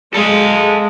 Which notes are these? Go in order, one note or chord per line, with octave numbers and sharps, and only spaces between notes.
G#3 A4 F5